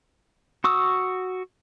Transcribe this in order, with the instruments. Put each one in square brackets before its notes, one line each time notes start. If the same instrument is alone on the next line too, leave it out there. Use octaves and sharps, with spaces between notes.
[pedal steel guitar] F#4 C#6 D#6 E6